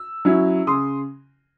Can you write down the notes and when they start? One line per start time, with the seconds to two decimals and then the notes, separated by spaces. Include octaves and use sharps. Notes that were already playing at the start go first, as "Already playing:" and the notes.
Already playing: E6
0.25 F#3 C#4 E4
0.67 C#3 C6 D#6